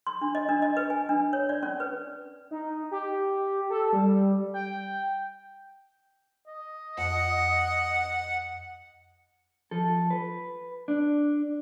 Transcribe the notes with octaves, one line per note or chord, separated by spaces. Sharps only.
C6
D4
D#5
D4
D#5
B4
G#5
D4
C#5
D5
C#4
B4
D#4
G4
A4
G3
G5
D#5
F2 F#5
F3 A4
B4
D4